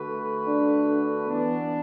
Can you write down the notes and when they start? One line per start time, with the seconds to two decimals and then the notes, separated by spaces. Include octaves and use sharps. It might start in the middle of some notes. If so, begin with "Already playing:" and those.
Already playing: D3 A3 F#4 B4
0.47 D4
1.27 E2 E3 B3 D4